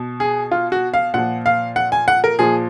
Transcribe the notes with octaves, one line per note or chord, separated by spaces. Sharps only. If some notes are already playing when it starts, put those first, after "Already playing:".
Already playing: B2
G#4
F4
F#4
F5
A#2 F3 F#5
F5
F#5
G#5
F#5
A#4
A#2 F3 G#4